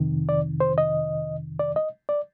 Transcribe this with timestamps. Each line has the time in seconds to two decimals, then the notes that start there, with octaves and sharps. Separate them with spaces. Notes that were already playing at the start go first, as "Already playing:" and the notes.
Already playing: F2 C3 D#3
0.29 D5
0.60 C5
0.78 D#5
1.59 D5
1.76 D#5
2.09 D5